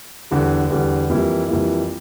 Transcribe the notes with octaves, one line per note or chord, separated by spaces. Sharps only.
E2 D3 G3
E2 D3 G3
F2 E3 G3 A#3 E4
F2 E3 G3 A#3 E4